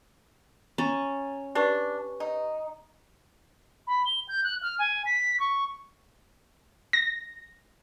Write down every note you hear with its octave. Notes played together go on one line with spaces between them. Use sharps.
C#4 A#5 A6
D4 G4 B4 C#6
D#4
B5
G7
G6
F#6
F6
G#5
B6
C#6
A#6